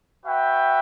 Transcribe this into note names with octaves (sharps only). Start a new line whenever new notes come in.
F#4 B4 E5 G5